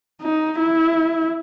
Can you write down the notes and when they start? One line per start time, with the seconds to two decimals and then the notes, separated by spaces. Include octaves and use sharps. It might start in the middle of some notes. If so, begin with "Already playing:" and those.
0.21 D#4
0.58 E4